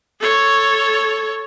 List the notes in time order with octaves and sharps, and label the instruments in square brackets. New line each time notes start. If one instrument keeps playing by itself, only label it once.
[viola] A4 C#5